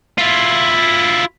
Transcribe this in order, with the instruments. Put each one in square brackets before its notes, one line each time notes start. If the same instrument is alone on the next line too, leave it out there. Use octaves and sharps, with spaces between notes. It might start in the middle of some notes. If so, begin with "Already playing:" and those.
[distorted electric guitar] E4 F4